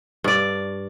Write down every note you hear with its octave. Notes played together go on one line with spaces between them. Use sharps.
G2 D5